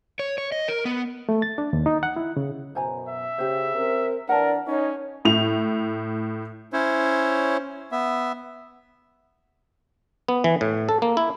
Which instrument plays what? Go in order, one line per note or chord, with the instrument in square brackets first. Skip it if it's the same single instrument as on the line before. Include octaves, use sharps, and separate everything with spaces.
[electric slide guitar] C#5
C#5
D#5
A#4
B3
[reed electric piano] A3
A6
D4
D#2
D#4
F#5
E4
C#3
[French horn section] F#2 B2 [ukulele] C5 G#5 A#5
[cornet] E5
[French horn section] C#3 [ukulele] G4 C5
[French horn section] C4 A#4
[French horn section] E3 D4 [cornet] A#4 [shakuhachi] D5 [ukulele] F#5 A5
[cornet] C#4 [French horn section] D#4 [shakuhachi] C#5
[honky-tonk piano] A2 F7
[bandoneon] C#4 E4 C5 C#5
B3 E5
[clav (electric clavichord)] B3
E3
A2
A4
A#3
E4